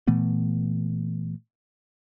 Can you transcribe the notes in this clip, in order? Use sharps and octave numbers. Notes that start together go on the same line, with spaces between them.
A#2 E3 A3 B3